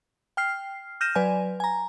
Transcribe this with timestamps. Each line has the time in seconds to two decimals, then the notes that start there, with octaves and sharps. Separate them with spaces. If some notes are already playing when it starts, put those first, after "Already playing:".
0.37 G5 F6 C7
1.01 F6 G6 A#6 D#7 E7
1.15 F#3 B4 D5 G#5
1.60 G#5 A#5